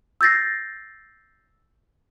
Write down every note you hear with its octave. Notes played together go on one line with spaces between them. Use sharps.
E6 G6 A6 A#6 C7